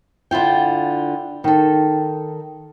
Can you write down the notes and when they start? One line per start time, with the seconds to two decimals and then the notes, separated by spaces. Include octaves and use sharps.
0.31 D3 E4 F4 G5
1.44 D#3 A4